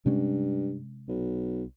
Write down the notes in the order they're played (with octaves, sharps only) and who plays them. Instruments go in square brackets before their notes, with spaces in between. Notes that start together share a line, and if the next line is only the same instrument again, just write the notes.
[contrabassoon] G2 [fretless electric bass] C3 G#3 C#4
[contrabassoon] B1